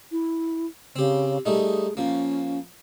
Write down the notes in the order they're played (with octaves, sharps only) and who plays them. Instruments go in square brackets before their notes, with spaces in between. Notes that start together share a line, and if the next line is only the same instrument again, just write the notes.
[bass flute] E4
[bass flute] C#3 [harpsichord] C4 G4
[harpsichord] G3 A3 D#4 [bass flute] G#4
[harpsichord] F3 A#3 [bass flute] C#4